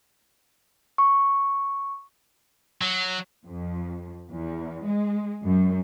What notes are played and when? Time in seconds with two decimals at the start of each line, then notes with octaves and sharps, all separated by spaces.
0.98 C#6
2.82 F#3
3.46 F2
4.30 E2
4.85 G#3
5.44 F#2